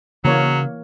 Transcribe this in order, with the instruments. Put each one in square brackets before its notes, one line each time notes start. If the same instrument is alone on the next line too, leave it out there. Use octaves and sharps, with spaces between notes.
[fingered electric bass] C#3 [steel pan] E3 A#3 C#5 [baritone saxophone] F#3